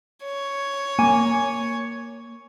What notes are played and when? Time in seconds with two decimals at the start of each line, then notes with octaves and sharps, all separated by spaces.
0.25 C#5
0.99 A#3 G#5